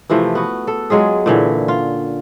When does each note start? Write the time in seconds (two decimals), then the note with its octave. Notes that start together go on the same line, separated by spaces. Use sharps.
0.09 C3 E3 F3 A3
0.35 B3 F#4
0.67 A4
0.90 F#3 G#3 F4 G#4
1.26 A#2 D3 E3 C#4
1.68 F4